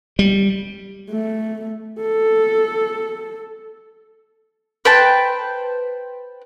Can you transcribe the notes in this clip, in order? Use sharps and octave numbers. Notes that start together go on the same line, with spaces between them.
G3
A3
A4
B4 C5 G5 A5